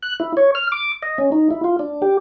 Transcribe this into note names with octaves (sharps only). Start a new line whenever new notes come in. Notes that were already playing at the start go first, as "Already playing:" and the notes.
F#6
E4
C#5
F6
D6
D#5
C#4
D#4
E4
F4
D4
G4